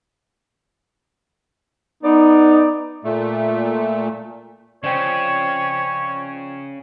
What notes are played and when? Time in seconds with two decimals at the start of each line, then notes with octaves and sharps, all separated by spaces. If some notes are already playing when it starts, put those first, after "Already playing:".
2.03 B3 D#4 D5
3.04 A#2 A3
4.84 C#3 F3 C4 C#5 D5 G5